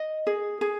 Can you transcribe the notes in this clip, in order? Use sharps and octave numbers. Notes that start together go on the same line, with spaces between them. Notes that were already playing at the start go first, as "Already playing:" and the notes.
Already playing: D#5
G#4
G#4